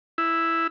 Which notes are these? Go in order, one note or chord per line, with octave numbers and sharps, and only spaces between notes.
E4